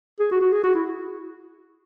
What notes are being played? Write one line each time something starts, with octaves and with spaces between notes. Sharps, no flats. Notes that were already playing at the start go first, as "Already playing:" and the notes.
G#4
F#4
F#4
G#4
F#4
E4